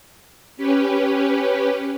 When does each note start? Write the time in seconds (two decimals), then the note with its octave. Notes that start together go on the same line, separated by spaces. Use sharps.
0.57 C#4 G4 B4